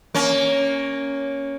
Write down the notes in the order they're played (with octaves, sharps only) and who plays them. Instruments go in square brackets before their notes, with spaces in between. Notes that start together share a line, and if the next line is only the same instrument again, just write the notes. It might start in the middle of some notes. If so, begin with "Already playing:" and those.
[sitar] A#3 C#4